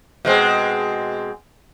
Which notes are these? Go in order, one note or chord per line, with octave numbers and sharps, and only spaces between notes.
B2 G#3 C4